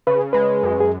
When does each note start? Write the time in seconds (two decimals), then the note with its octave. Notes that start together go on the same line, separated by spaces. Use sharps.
0.07 C#3 B4
0.33 G#3 B4
0.63 F#2
0.80 G#4